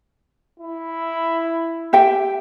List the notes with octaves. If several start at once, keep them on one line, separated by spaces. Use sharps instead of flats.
E4
G4 E5 G5